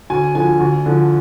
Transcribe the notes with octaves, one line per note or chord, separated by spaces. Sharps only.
D2 G#5
D3 F3 G#5
D2
D3 F3